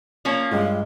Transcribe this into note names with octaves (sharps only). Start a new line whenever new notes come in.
F3 A#3 C#4
G2 G#3 F4